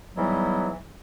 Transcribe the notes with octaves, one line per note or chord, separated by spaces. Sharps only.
G#2 E3 F#3 G3 B3